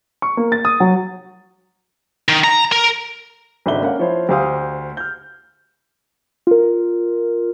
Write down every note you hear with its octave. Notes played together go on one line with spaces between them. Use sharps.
C#6
A#3
A6
D#6
F#3
D#3
A#5
A#4
G#1 C#2 D4 A4 E5 G7
A#3 C#4 F5 F#5
F3 E4 C5 C#5
D2 G4 C5 F5 D#6 F6
F6 G6
F4 A#4